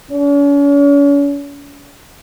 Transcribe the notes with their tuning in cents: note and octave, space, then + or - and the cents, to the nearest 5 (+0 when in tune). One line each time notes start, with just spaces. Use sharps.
C#4 +40